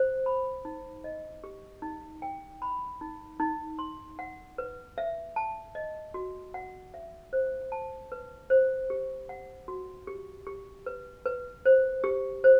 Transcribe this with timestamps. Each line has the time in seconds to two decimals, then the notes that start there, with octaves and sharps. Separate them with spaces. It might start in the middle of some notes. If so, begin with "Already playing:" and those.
Already playing: C5
0.26 B5
0.65 D#4
1.04 D#5
1.44 G4
1.82 D#4
2.22 G5
2.62 B5
3.01 D#4
3.40 D#4
3.79 C6
4.19 F#5
4.58 B4
4.98 E5
5.36 A5
5.75 D#5
6.14 F#4
6.54 F#5
6.94 E5
7.33 C5
7.72 A5
8.12 B4
8.50 C5
8.90 G4
9.29 F#5
9.68 F#4
10.07 G4
10.47 G4
10.86 B4
11.26 B4
11.66 C5
12.04 G4
12.44 C5